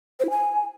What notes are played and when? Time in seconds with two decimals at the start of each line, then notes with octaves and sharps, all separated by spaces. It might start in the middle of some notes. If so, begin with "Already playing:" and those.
0.20 C5
0.25 E4
0.30 G#5